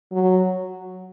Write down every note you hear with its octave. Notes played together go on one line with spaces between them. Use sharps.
F#3